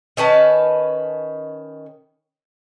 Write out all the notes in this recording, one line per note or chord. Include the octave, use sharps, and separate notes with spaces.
D#3 C#4 B4 A5